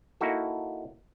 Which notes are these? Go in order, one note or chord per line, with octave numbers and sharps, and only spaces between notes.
A#3 D#4 E4 F#4 A4